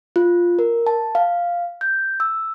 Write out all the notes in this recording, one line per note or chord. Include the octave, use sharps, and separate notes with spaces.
F4
A#4
A5
F5
G6
E6